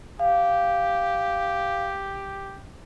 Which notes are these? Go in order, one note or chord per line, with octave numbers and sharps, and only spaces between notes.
G4 F5